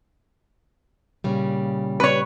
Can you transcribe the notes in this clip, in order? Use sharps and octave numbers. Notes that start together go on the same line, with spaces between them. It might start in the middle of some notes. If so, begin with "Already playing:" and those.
A#2 C#3 G3
B4 C#5